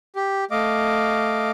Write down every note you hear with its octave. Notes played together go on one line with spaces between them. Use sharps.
G4
A3 D#5 F5 D6